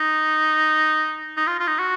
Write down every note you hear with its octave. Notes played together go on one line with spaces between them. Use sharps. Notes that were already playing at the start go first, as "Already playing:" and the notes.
Already playing: D#4
D#4
F4
F4
D#4
F#4